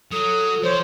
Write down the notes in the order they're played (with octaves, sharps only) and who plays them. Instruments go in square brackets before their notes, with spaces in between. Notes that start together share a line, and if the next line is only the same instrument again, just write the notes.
[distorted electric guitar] F#3 [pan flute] A4 [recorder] D#6
[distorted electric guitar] F3 [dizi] C5 [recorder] C#5